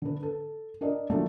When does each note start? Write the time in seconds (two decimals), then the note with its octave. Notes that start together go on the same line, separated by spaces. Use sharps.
0.02 D3 B4
0.23 A4
0.81 D4 A#4 D5 D#5
1.10 D#3 F3 F#3 A3 A#3 D4